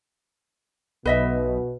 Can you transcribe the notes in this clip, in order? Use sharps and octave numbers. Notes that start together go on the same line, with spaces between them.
B1 B2 B4 D#5 E5